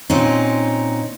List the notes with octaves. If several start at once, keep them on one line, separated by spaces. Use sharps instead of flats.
A#2 C4 C#4 D#4